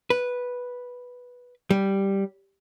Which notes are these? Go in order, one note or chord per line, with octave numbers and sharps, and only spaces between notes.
B4
G3